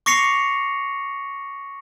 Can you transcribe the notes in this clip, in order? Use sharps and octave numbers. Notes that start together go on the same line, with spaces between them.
C#6 D6 A#6 C7 C#7 F7